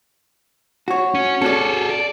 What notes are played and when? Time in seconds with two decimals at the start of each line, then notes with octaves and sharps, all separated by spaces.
0.88 F#4 C#5
1.15 C#4
1.42 C#4 F#4 G#4 A4 D5
1.90 D5